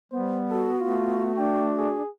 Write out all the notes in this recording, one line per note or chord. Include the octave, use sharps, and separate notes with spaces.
G3 B3 C5
F#4 A4
A3 F4
D4 G5
G#4